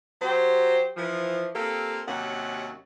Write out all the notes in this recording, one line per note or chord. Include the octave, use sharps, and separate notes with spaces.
F#3 G4 C5
E3 F3
A#3 C4 F4 G4 A4
D#2 C3 F#3 C#4 F#5